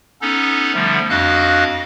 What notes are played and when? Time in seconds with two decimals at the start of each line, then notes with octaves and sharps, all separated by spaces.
0.21 B3 C#4 D#4 A4
0.74 D3 F3 G3 A3 B3
1.09 F2 D4 F#4 D#5 F5 F#6